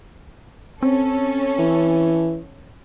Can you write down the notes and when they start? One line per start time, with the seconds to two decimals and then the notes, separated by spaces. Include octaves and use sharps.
0.83 C4 C#4 A4
1.59 E3